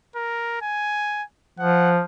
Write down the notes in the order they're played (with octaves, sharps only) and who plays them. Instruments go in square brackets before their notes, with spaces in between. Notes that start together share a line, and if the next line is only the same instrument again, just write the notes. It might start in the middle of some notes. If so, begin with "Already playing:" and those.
[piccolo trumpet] A#4
G#5
[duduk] F3 [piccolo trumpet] F#5